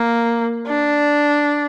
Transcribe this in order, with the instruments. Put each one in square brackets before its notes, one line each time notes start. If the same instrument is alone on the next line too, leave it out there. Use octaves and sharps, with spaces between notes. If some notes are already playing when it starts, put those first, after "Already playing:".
Already playing: [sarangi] A#3
D4